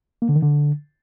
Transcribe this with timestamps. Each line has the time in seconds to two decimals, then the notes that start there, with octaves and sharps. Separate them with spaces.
0.22 A#3
0.29 D3
0.36 D#3
0.42 D3